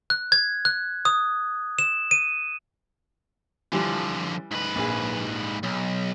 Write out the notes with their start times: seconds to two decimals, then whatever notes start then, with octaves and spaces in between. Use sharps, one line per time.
0.10 F#6
0.32 G#6
0.65 F#6
1.05 D#6
1.79 E7
2.11 D#7
3.73 D3 E3 F3 G3
4.51 G#2 B4
4.75 A#1 G#4
5.63 B1